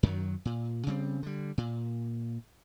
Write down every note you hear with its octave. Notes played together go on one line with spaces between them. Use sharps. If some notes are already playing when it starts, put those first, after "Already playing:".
F#2 D#3 F#3
A#2
C#3 G3 C4
D3 G3
A#2